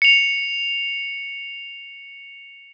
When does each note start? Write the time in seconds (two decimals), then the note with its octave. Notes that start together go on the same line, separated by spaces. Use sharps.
0.02 C#7 F7